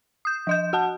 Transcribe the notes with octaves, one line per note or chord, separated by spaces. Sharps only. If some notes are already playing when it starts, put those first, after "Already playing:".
D#6 G6
F3 D#5 G6
F#4 F#5 A5